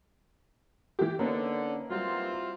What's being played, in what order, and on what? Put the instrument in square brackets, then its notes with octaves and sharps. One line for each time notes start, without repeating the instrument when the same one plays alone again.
[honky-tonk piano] E3 G4
[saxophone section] D3 [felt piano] A#3 B3 D#4 [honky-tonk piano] C#4
[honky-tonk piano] F#3 G3 [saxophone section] C4 E4 F4